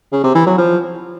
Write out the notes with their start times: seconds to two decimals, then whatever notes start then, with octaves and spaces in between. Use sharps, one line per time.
0.12 C#3
0.24 C3
0.35 E3
0.46 F#3
0.58 F3